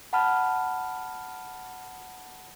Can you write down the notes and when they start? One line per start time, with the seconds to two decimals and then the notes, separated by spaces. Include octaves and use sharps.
0.13 F#5 A5 B5 F6